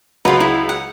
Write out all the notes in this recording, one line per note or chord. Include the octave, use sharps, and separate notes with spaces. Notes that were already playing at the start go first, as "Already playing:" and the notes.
C#2 F#3 F4 B4 A#5
E4
F#5